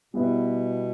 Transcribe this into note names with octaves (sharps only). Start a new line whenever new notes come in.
B2 G3 B3 E4